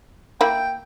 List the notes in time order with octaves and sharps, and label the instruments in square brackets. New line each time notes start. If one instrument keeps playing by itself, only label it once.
[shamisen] A#3 E4 [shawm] G5